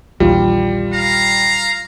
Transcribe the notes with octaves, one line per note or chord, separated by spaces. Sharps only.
A#1 D#2 E3 G3 F4
F5 A#5